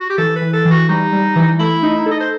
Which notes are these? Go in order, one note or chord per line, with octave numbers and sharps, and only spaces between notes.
F#4
G4
E3 A4
B4
E3
A4
E3
F#4
G3 D#4
G3
E3
A3 E4
D#4
A4
D#5
C5